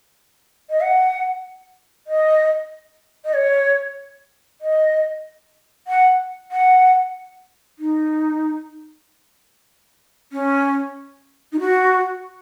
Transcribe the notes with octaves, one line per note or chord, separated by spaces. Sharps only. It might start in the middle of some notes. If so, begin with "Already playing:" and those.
D#5
F#5
D#5
D#5
C#5
D#5
F#5
F#5
D#4
C#4
D#4
F#4